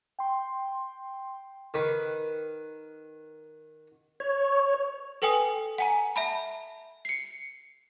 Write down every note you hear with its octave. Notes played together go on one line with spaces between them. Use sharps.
G5 C6
D#3 B4
C#5
A4 B4 G5 G#5 D#6
F#5 G#5 A#5
E5 A5 B5
C7 C#7